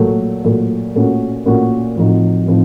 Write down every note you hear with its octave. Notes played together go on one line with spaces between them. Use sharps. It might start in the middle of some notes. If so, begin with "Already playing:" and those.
Already playing: A#2 F#3 A3
A#2 F#3 A3
A#2 A3 C#4 F#4
A#2 A3 C#4 F#4
A2 F3 C4 D#4 F#4
A2 F3 C4 D#4